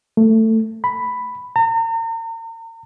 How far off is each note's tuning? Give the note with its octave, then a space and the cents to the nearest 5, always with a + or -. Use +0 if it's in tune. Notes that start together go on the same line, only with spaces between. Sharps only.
A3 +15
B5 +5
A#5 -40